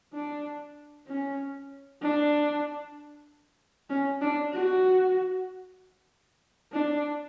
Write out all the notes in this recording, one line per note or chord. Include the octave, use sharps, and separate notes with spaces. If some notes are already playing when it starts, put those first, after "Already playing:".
D4
C#4
D4
C#4
D4
F#4
D4